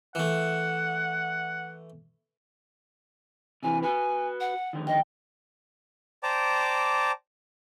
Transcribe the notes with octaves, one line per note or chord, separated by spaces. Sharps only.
E3 A3 F#5
C3 E3 G#5
F#4 B4 G#5
F#5
F2 D3 D#3
D#5 G5
C5 D5 G5 A5 A#5 D6